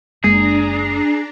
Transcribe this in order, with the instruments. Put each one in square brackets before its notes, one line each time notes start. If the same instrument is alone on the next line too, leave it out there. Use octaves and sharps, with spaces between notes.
[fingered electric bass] F#1 G#3 A#3 [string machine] D4 A#5 [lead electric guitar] G#4